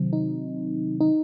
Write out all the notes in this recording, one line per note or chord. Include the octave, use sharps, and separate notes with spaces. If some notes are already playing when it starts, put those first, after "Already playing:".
Already playing: C3 D#3 F#3 C4
D#4
D#4